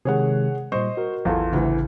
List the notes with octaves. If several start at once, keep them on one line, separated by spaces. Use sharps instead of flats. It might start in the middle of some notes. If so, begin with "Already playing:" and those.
C3 D#3 G#3 G#4 C#5 F#5
A#2 G3 C5 D#5 C#6
F#4 A#4
A1 E2 F4 A4 F5
A1 D2 C#3 E3